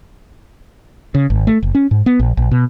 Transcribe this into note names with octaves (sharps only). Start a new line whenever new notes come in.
C#3
G#1
A3
F#1
C#4
G#2
B3
A#1
A#1
B2